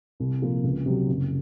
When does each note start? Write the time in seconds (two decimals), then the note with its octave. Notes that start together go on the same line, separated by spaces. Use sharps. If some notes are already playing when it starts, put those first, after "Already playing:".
0.20 C2
0.42 A#2 F3 A#3 F4
0.64 C#2
0.86 C3 F#3
1.08 F#1